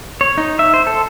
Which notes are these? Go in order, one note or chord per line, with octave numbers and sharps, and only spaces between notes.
C#5
D#4
E5
C5
A4